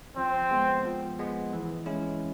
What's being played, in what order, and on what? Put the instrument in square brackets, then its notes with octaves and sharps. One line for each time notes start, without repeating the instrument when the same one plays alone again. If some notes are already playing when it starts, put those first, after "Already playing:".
[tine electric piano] F3 [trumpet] C4
[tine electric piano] G#3 B3
F3
G#3 B3
E3
G#3 C#4 E4